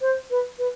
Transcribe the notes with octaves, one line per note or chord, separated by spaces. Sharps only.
C5
B4
B4